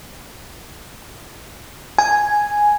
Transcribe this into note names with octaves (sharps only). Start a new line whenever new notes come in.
G#5